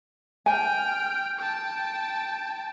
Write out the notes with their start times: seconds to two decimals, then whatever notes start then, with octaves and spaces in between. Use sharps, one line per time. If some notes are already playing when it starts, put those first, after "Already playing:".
0.46 G5 G#5 F6
1.38 G5 A5